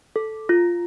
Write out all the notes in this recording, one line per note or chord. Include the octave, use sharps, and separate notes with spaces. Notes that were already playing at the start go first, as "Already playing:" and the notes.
A4
F4